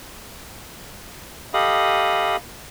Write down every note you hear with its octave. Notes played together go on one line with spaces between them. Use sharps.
G4 A4 D#5 F5 B5 D#6